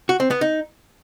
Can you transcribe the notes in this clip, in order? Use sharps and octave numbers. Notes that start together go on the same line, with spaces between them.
F#4
C4
B3
D#4